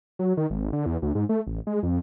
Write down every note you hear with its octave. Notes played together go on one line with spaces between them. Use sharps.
F#3
D#3
G#1
D3
E2
D2
G#2
A3
A1
G#3
F2